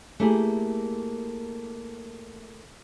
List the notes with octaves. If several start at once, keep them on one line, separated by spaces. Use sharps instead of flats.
A3 A#3 E4 G4 G#4